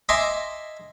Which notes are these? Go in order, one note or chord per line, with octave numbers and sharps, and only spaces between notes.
D#5 E5 G#5 A#5 C6 D6